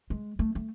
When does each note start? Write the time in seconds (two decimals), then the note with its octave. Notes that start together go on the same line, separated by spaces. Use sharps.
0.10 G#3
0.39 A3
0.55 A3